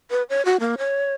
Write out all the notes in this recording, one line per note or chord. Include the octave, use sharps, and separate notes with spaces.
B4
C#5
F#4
A#3
C#5